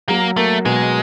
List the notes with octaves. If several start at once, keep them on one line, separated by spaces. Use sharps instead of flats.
F#3 A#3
A3 A#3
B2 G#3